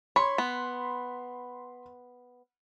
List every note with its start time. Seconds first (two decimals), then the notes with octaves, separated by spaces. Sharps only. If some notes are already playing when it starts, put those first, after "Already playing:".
0.16 C#5 B5 C6
0.38 B3